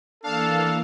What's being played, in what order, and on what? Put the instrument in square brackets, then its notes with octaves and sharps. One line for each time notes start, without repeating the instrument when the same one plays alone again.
[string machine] E3 A#3 [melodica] D4 [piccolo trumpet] A4 [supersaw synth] F5 A5